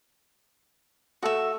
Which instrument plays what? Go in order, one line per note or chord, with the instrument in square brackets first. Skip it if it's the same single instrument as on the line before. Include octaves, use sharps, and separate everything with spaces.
[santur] A3 A4 D#6 [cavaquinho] F#4 E5